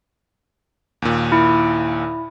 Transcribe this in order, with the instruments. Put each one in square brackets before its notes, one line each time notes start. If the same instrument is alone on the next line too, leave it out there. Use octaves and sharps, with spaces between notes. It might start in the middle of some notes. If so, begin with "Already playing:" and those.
[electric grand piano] D#2 A#2
[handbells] E4